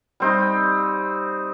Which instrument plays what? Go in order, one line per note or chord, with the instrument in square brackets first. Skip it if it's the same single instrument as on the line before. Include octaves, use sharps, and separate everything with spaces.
[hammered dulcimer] G3 C4 D#4